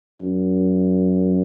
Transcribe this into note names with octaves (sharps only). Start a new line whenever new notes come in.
F#2